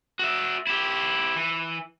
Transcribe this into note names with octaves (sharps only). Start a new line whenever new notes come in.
F#4 E5
E4 G4
E3